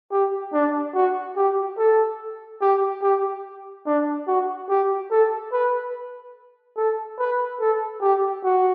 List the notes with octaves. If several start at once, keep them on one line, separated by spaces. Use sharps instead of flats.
G4
D4
F#4
G4
A4
G4
G4
D4
F#4
G4
A4
B4
A4
B4
A4
G4
F#4